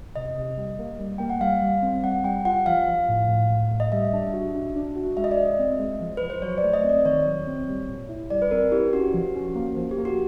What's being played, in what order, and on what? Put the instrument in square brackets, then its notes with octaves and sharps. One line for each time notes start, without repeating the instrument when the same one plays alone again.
[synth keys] C3 [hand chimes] D#5
[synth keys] C3
G3
A#3
G3
[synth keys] A#3 [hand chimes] G5
[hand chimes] F#5
[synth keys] G3 [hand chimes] F5
[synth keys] G3
C4
[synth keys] G3 [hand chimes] F#5
[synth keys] G3 [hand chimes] G5
[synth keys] F4 [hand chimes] F#5
[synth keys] F3 [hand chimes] F5
[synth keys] F3
A2
A2
A2
A2
[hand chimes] D#5
[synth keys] G3 [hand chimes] E5
[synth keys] D4
F#4
D4
D4
F#4
[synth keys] G#3 [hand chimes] E5
[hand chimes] D#5
D5
[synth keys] G#3 [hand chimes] D#5
[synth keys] C4
G#3
F3
[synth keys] F3 [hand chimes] B4
[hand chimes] C5
[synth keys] F#3 [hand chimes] C#5
[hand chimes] D5
[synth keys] A3
[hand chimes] D#5
[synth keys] C4
[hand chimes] D5
[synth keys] D#3 [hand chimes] C#5
[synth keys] F#3
C4
G3
A#2
E4
[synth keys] G3 [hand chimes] D5
[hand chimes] B4
[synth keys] C4 [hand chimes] A#4
[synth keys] E4 [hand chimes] G4
[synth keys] C#4 [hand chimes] F#4
[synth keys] F3
C#4
A#3
F3
[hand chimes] G4
[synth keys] A#3
[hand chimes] F#4